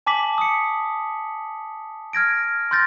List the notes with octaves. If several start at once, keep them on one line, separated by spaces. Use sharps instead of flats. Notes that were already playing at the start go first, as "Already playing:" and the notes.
G#5 A5 D6 B6 F#7
D#6 C#7
F6 G#6 A#6 D7
C6 F6 G6 A6 A#6